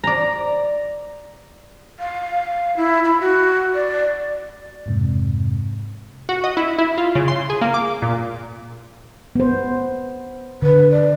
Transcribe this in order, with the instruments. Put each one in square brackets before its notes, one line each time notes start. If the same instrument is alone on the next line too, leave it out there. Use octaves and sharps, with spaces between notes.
[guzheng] D5 A#5
[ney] F5
E4
B5
F#4
D5
[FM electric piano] F2 G#2 C3
[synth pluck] F#4
D#5
E4
E4
F4
C#3
C6
G#4
A#3
D6
A#2
[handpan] B3 C5
[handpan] D3 [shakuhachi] B4
[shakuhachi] D5